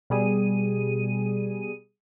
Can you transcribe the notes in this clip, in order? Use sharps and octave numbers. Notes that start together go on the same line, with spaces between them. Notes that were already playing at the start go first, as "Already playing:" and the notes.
B2 G3 G#4 D#7